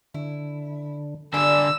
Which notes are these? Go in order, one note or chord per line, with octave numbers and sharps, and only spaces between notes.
D3 E4
D3 G3 D5 G#5 E6